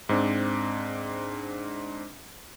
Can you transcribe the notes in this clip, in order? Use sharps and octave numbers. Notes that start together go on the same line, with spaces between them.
G#2 C4 D4